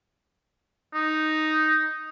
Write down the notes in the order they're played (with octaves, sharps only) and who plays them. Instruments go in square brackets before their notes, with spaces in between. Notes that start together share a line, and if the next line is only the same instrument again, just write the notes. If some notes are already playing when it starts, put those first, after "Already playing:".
[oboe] D#4